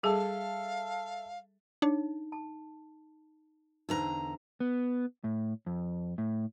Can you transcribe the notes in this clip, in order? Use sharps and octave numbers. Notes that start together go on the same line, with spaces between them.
G3 G#4 A4 E5 F5
D4 D#4 C#5
A5
E2 D3 D#4 B4 C5 A#5
B3
A2
F2
A2